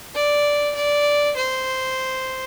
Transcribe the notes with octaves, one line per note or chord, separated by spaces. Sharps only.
D5
D5
C5